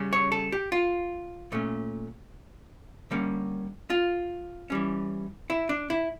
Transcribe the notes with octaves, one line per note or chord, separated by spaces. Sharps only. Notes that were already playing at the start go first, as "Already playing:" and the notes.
Already playing: C#3 G3 C#4
C#5
A4
G4
F4
A#2 A3 C#4
D3 G3 A#3 C#4
F4
E3 G3 C#4
E4
D4
E4